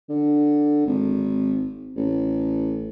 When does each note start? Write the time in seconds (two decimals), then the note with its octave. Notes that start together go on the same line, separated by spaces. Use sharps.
0.09 D3
0.86 G#1
1.96 A1